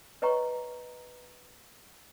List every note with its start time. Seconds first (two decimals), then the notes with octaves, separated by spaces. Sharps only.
0.22 B4 C#5 D#5 G5 A#5 C#6